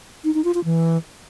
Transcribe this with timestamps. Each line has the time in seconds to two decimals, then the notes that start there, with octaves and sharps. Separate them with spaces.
0.24 D#4
0.34 D#4
0.44 F4
0.54 F4
0.64 E3